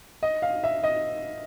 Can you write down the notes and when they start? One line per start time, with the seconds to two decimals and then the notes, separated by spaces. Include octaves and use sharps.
0.23 D#5
0.42 F5
0.64 E5
0.84 D#5